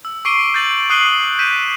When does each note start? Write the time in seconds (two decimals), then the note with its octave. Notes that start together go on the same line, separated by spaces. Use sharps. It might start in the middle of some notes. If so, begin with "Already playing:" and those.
0.05 E6
0.25 C#6 D6 C7 D7 D#7 G7
0.54 G6 A6 F#7
0.90 D#6 F#6 C7 D#7 F#7 G7
1.39 G6 B6 D#7 E7